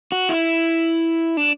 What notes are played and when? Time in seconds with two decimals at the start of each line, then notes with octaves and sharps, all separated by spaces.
0.12 F#4
0.29 E4
1.37 D4